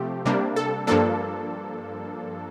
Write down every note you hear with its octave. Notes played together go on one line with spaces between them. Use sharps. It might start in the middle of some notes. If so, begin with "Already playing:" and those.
Already playing: C3 F3 A3 C4 G4
C3 G3 A#3 D4
A4
G2 F3 A#3 D4 A4